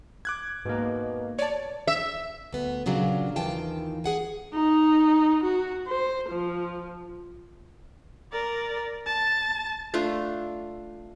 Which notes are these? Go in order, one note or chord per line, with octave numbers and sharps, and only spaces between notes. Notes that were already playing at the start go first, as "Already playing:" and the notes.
D6 F#6 G#6
G#2 B2 A#3
C#5 D5 A5
E5
D2 B3
A#2 C#3 F#3 D4 F4
D#2 D#3 E3 F4 G5 A5
G#4 F#5 G#5
D#4
F#4
C5
F3
A#4 D5
A5
A3 D4 F4